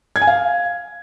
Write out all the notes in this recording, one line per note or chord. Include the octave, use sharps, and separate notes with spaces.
G#6
G#5
F5